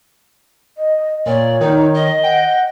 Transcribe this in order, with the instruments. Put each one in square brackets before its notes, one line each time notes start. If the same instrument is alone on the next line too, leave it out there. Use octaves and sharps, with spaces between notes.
[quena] D#5
[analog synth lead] A#2 [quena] C#5 [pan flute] D5
[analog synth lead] D#3 [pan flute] D#4
[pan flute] D#5
[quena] F#5 [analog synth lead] G5